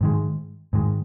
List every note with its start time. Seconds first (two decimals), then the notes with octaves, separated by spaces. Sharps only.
0.01 G#2 D#3 G#3
0.73 G#2 D#3 G#3